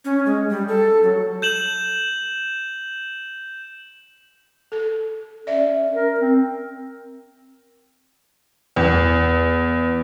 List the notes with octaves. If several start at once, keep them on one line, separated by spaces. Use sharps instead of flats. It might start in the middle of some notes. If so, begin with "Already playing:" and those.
C#4
G#3
G3
A4
F#3
G6 E7 F#7
A4
C#4 D5 E5
A#4
C4
E2